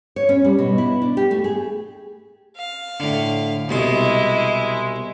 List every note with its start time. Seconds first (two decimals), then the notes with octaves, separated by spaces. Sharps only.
0.16 C#5
0.29 C#4
0.44 G3
0.59 B2
0.78 E4
1.02 D4
1.17 G4
1.31 A3
1.44 G#4
2.57 F5
3.00 A2 D3
3.69 C2 B2 G#3 E4 C6